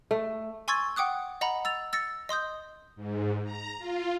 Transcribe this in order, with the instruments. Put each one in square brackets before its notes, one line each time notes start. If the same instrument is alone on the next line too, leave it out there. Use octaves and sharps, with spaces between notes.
[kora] A3
[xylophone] G#5 C6 C#6 E6 G#6 A6
F#5 G5 D6 D#6 F#6
D#5 F#5 A#5 B5
E6 A6 F7
E6 A6 A#6 C#7
D#5 C6 D#6 G6
[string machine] G#2
A#5
F4